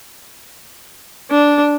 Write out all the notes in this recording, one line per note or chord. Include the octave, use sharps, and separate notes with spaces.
D4